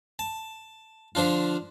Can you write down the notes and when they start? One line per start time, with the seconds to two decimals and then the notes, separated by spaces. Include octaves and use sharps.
0.19 A5
1.15 D3 F3 D4 F4